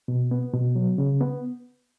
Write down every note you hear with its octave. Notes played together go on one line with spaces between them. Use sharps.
B2
B3
B2
F#3
C#3
B3